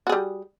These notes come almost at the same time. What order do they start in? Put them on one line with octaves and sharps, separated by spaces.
F#4 G#4 G3